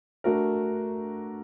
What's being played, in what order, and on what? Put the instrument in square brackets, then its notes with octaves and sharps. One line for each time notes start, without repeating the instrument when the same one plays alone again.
[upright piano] A3 D4 F#4 A#4